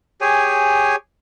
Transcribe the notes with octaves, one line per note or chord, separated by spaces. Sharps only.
G4 G#4 C#5 G#5